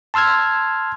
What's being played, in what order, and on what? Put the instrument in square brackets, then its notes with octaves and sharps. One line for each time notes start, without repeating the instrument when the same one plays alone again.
[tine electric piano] A5 C6 E6 F6 G#6